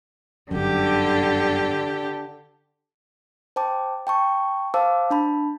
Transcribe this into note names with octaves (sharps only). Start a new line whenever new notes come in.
G1 F#2 D3 G4
C5 G5 A5 D6
G5 A5 C#6
C5 F5 A5 D6 E6
D4 A5 B5